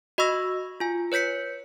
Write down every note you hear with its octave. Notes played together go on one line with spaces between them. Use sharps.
F#4 D#5 B5 C#6 E6 A#6
F4 G#5
B4 C#5 G6 B6 C#7